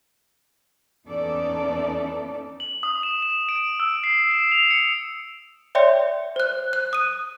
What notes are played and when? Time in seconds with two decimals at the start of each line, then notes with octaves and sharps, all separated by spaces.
1.08 E2 B3 C#4 D#4 A4 D5
2.60 F#7
2.83 D#6
3.03 E7
3.22 E7
3.49 D7
3.80 E6
4.04 C7
4.31 E7
4.52 F7
4.71 C#7
5.75 C#5 D5 E5 G5 C6 C#7
6.36 C5 F#6
6.73 F#6
6.93 D#6 D#7